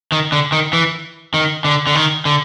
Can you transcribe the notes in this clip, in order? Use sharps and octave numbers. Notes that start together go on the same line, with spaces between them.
D#3
D3
D#3
E3
D#3
D3
D3
D#3
D3